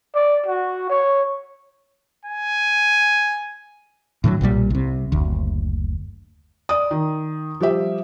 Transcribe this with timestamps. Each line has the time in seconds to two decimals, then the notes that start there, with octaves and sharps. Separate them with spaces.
0.15 D5
0.46 F#4
0.89 C#5
2.25 G#5
4.24 A2 D3 F3 F#3
4.41 B1 A#2 E3 G3
4.70 C2 C3
5.12 F#1 D2
6.69 D5 D#6
6.91 D#3
7.60 F3 G3 G4 E5